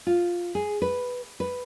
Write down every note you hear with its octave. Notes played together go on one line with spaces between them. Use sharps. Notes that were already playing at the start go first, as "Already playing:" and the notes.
F4
G#4
B4
B4